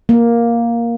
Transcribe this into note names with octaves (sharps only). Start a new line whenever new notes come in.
A#3